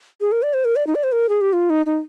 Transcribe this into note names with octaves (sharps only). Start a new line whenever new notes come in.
G#4
A#4
D5
C5
A#4
D5
D#4
D5
C5
A#4
G#4
G4
F4
D#4
D#4